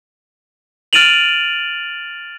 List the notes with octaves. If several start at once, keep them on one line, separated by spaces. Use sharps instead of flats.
F6 A6 D7 D#7 F7 F#7